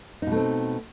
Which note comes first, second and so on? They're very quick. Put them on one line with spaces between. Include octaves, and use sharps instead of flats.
D#4 B2 A3 C4